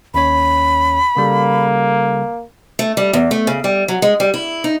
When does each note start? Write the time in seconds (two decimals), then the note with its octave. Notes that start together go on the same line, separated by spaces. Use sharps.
0.14 D#2 C#4 C#5 B5
1.17 C#3 G3 A#3 A4
2.79 A3
2.97 G3
3.13 E2
3.31 A3
3.47 C#3
3.64 G3
3.88 F#3
4.02 G#3
4.20 G3
4.34 E4
4.64 D#4